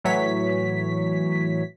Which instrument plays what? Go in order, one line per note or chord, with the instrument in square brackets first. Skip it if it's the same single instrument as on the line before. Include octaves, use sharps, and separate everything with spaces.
[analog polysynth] A2 E3 F#3 C#5 B6